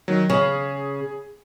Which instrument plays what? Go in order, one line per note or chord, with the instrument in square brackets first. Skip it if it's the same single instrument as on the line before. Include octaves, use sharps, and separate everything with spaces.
[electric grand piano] D#3 F#3
[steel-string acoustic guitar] C#3 [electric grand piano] G#4